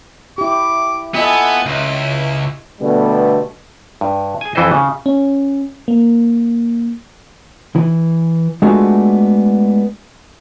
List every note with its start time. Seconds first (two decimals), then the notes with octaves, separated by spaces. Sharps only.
0.38 E4 G4 D6
1.15 B3 F4 A4 D#5 E5 G#5
1.65 C#2 E4
2.80 B2 D3 G3 A3 B3
4.01 G2
4.41 G#4 G#5
4.55 F2 E3 E4 A4 C5 D#5
4.71 C#3
5.06 C#4
5.88 A#3
7.76 E3
8.62 G#3 A3 B3 D4 F4 F#4